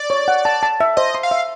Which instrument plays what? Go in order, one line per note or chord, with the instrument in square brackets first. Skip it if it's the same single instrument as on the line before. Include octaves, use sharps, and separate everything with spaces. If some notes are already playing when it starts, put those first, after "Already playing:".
Already playing: [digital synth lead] D5
[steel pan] C#5
F#5
A5
A5
E5
[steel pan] C5 [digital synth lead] D#5
[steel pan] C6
[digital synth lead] F5
[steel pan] E5